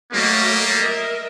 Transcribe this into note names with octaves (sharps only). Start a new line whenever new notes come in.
F#3 G3 A3 A#3 D#5
A#4 D#5 E5